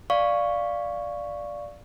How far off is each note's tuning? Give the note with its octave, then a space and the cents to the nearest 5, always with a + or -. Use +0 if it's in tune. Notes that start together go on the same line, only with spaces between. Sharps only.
D5 +0 F5 +0 C#6 +0